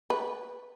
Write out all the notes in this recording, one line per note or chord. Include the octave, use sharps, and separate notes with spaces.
B4